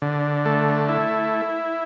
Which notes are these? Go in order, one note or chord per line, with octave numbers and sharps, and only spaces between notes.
D3
A3
E4